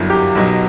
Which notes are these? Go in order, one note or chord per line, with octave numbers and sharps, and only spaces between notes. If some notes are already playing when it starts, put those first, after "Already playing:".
Already playing: G1 F#2 F#3 E4
G4
B1 B2 F#3